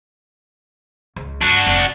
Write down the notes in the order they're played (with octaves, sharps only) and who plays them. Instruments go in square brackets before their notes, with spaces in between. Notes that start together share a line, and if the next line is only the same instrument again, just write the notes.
[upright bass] C#2
[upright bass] G2 [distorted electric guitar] D4 F#4
[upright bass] F1